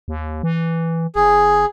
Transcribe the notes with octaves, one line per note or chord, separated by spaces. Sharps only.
D#2
E3
F#1 G#4